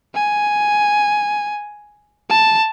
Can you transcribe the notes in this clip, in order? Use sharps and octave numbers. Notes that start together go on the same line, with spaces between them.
G#5
A5